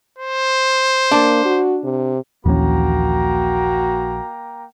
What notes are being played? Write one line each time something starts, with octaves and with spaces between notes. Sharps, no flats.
C5
A#3 D4
F#4
C3
A#1 D#2 E3 A#3 C#4 F#4 G5 A#5